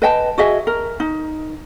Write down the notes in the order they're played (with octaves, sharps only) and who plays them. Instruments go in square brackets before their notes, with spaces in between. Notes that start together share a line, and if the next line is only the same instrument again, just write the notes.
[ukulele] B4 D#5 G5 A5
F#4 G#4 D#5 E5
A#4
D#4